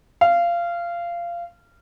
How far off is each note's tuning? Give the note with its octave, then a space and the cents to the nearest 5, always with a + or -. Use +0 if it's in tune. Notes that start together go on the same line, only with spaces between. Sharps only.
F5 -20